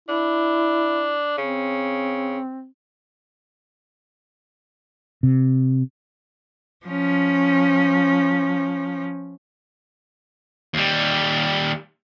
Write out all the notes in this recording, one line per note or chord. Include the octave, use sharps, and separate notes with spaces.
D4 E4
C#3 C4
C3
F3 C#4
D#2 G3